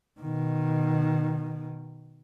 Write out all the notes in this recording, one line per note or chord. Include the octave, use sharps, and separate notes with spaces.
B2 D#3